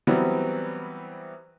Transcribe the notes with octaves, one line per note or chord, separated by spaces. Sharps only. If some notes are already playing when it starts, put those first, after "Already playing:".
E3 F#3 G3 B3 C4